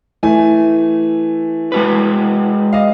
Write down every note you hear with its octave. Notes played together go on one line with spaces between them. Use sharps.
E3 A3 G#5
G#3 F#4 B4
D#5 F5